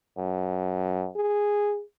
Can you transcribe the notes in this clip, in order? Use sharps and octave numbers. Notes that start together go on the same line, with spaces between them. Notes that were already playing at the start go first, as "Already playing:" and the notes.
F#2
G#4